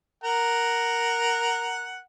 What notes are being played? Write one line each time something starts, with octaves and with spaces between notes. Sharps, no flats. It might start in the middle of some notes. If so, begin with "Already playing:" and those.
A#4 F#5